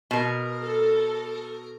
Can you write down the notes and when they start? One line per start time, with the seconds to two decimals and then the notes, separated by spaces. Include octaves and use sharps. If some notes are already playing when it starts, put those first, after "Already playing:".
0.11 B2 A#4
0.62 A4